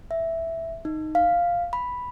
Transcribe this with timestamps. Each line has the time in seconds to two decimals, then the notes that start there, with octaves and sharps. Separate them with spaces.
0.11 E5
0.85 D#4
1.15 F5
1.73 B5